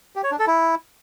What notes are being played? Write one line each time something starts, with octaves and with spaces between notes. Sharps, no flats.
G4
C#5
D4
A4
E4